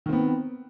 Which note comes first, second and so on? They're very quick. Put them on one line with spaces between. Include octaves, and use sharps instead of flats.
D#3 C4 B3